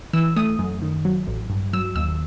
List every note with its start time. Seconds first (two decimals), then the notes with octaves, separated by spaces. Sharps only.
0.13 E3 E6
0.36 A3 D#6
0.59 F#2
0.82 D#3
1.05 F#3
1.27 A1
1.50 G2
1.73 F#3 E6
1.96 D#2 E6